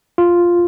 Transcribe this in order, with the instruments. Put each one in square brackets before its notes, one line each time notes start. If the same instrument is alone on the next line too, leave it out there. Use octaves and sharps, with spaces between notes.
[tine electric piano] F4